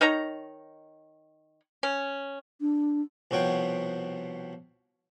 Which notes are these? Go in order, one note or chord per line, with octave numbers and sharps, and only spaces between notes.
D#3 D#4 C#5 A#5
C#4
D4
C2 B2 F3 C#5 F#5 G5